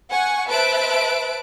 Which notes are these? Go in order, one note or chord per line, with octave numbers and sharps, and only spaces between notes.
F#5 G#5 C#6
B4 C5 E5 A5 F#6 D7